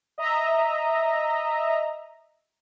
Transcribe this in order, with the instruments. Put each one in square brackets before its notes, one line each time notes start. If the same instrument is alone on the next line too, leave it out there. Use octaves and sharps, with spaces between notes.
[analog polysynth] D#5 E5 A#5